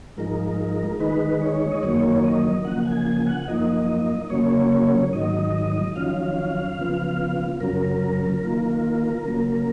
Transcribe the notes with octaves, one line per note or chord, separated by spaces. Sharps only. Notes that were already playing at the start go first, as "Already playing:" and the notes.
G#2 F3 G#3 D#4 A#4
D#3 G#3 D#4 B4
C#5
D#5
F#2 D#3 F#3 A#3 C#5
D#5
C#3 F3 A#3 F#5
G#5
G#5
F#5
F#2 F3 A#3 D#4 D#5
C#3 F#3 A#3 C#5
G#2 D#3 F#3 D#5
F2 D#3 F#3 C#4 F4 F5
C#3 F3 B3 F4
F#2 C#3 F#3 A#4
D#3 A#3 F4
C#3 F#3 A#3